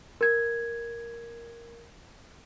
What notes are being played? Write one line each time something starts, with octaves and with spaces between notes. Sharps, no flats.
A#4 G#6